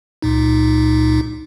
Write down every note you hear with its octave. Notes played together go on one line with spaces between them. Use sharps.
C#2 A#2 D#4